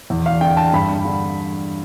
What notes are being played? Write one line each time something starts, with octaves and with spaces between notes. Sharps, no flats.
E2
F5
D3 G5
A5
G2 B5
D3